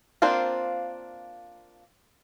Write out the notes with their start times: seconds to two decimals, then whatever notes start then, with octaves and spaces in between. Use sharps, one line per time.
0.22 A#3 C4 D4 F4 C5